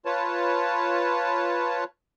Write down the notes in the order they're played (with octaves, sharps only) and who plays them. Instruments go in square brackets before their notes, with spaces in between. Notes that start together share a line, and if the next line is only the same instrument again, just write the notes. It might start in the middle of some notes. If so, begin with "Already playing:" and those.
[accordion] F4 B4 C#5 A5